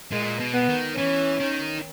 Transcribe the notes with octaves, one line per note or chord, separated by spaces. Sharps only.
A#2 G#3
B2
B3
D#3
E3 C#4
D#3